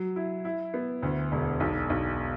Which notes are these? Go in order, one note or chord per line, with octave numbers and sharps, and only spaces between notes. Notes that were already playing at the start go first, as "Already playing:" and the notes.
Already playing: F#3
E4
E4
B3
D2
E1
B1
B1